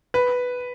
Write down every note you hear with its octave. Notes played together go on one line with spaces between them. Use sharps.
B4